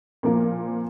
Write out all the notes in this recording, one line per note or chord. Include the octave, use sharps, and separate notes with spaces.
A#2 F3 A#3 F4 A#4